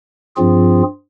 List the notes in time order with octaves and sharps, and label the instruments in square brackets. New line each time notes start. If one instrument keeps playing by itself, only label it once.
[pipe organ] G2 F3 C4 F4 G#4